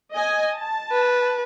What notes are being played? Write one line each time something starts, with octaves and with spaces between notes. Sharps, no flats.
D#5 G#5
A5
B4